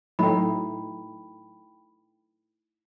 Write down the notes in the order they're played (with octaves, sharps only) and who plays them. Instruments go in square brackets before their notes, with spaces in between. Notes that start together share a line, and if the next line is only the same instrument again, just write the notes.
[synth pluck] A2 F#3 [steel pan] A3 D#4 E4 [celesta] G5 B5